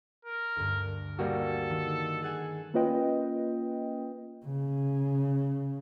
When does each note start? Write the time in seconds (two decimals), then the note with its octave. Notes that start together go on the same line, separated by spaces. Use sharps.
0.25 A#4
0.56 D2 G2
1.19 G3 A#3 F#4 A4
1.70 D#3
2.22 G#4 F#5 G#5
2.74 A#3 C#4 F4 B4 D#5 G5
4.46 C#3